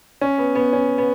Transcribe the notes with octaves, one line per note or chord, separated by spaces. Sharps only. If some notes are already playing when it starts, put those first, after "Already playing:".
C#4
B3
B3
C#4
B3